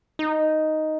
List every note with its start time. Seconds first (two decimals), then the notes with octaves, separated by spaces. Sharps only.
0.19 D#4